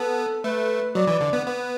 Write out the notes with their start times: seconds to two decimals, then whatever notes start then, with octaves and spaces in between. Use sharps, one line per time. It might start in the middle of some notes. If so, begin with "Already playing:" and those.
Already playing: B3 A4
0.44 A3 B4
0.95 F#3 D5
1.07 E3
1.20 D3
1.33 B3
1.47 B3 B4